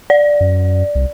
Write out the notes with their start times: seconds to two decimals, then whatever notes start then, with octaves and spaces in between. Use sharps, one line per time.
0.10 D5
0.41 F#2
0.95 C2